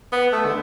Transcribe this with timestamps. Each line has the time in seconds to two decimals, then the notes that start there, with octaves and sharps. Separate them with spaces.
0.12 B3
0.33 A3
0.46 D3